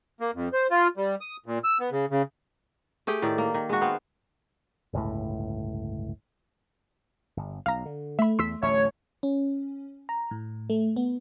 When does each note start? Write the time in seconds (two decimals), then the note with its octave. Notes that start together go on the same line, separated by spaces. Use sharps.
0.20 A#3
0.34 F2
0.53 C5
0.70 F4
0.97 G3
1.21 D#6
1.46 A#2
1.64 E6
1.80 B3
1.92 C#3
2.11 C#3
3.07 A3 G4 G#4 G5
3.22 A2 D#3 D5
3.38 A#3
3.54 D#3
3.69 G#3 F#4
3.81 B3 C4 F5
4.93 G1 C#2 A2
7.37 G1
7.66 B1 F5 A#5
7.86 D3
8.19 A3 E5 B5
8.39 E2 C6 E6 B6
8.63 D1 A1 C#5 E5
9.23 C#4
10.09 A#5
10.31 A2
10.70 A3
10.96 B3